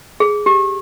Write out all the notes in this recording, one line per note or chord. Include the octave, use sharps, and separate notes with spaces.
G#4
G4